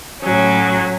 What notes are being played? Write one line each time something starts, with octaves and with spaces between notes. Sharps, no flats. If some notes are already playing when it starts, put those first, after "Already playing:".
A2 F#3 C#4